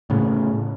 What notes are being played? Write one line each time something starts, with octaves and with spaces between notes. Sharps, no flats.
A2 C#3